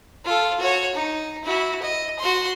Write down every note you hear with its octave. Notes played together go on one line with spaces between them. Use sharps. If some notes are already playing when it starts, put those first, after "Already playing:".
F4 A4
F#4 C#5
D#4
E4 F#4
D#5
F#4 C6